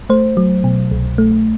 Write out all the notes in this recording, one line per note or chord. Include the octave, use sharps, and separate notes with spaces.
A3 C5
F#3
B2
C2
A3